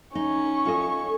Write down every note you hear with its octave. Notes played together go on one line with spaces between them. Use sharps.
C#4 D#4 C#6
F4 A4 D#5